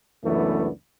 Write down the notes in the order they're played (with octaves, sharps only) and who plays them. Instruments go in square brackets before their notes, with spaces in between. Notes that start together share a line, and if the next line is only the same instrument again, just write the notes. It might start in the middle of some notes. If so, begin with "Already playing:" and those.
[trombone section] C#2 F#2 E3 A3 B3 D4